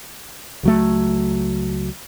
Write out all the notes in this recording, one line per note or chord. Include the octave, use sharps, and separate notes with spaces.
C#2 F#3 A3